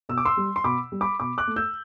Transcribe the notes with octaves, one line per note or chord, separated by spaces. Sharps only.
B2 E6
D6
C6 E6
G3
C6
B2 B5 D6
G3
B5 D6
B2 B5 D6
D6 F#6
A3
E6 G6